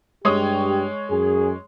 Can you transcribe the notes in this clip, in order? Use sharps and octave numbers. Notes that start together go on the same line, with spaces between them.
G2 G#3 G4 C#5 D#6
F#2 G#4